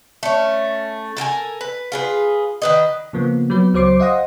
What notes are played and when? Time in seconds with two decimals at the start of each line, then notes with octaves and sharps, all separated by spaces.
0.23 A3 C#4
1.17 A4 A#4 G5 G#5
1.61 B4
1.92 F4 G#4 B4
2.62 D#3 B4 D#5
3.13 C#3 F3 A#3 B3
3.50 F#3 B3 B4
3.74 C#2 F#3 C5 D6 C7
3.99 C5 D#5 F5 F#5 D#6 A#6